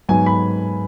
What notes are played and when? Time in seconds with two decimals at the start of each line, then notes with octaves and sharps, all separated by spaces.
0.09 G#2 F#3 B3 G#5
0.26 B5